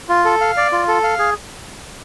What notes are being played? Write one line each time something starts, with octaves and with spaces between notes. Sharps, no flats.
F4
A4
F5
D5
F4
A4
F5
G#4